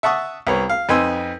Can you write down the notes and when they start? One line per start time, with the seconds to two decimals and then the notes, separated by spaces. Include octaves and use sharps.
0.03 E5 F#5 A5 C#6 D#6
0.47 C2 B3 C#5
0.70 F5
0.89 F2 D#4 B4 G#5 C6 E6